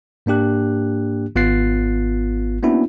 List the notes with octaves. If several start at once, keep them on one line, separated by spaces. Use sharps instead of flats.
G#2 A#3 D4 G4 F#6
G#1 B3 F4 F#6 A6 C7
A#3 B3 C#4 D4 E4 F#4